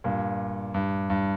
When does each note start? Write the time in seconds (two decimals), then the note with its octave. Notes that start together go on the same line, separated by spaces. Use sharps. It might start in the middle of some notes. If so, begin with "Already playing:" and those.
0.04 G2 A#2
0.74 G2
1.10 G2